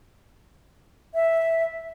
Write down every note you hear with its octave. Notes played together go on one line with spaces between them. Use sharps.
E5